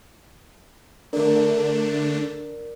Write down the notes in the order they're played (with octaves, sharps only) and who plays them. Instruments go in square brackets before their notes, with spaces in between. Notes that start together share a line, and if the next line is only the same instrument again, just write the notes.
[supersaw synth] D3 A3 D4 [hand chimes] A#4 D5